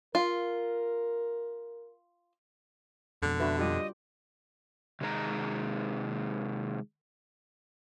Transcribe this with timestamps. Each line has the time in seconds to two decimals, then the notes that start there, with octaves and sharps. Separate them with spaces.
0.15 F4 A#4
3.22 F2 B2 D3
3.40 D4 F#4 B4 E5
3.59 G3 F4 G4 D#5
5.01 C3 D#3 G#3 C5 A#5